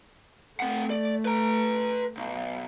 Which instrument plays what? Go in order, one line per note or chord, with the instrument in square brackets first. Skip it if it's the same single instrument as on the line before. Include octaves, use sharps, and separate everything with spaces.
[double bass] A3 [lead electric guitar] C4 F#5
[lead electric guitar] D5
B4 A#5
B1